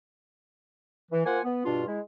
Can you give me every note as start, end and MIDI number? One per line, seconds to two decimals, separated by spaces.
1.11 1.25 52
1.26 1.40 58
1.26 1.40 65
1.26 1.40 72
1.26 1.40 78
1.26 1.40 80
1.44 1.62 59
1.65 1.83 43
1.65 1.83 47
1.65 1.83 62
1.65 1.83 65
1.87 1.99 56
1.87 1.99 64